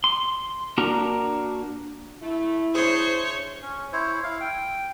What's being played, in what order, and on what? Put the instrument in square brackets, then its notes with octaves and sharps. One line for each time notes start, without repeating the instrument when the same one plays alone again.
[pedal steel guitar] C6
A#3 D4 F#4 A#4 A#5
[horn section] A3 [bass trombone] E4
[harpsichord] D4 G#4 [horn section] C5 [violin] C#5
[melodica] C#4
E4 C5 C#5
E4 F5
G5